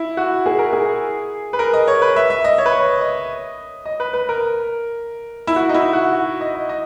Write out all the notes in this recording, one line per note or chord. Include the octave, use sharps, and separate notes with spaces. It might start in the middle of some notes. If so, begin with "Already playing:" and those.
Already playing: E4
F#4
G#4
A#4
G#4
B4
A#4
D#5
C#5
B4
E5
E5
D#5
C#5
B4
C#5
D#5
D#5
B4
B4
A#4
E4
F#4
D#4
E4
F#4
F#4
D#5
D#5
D#5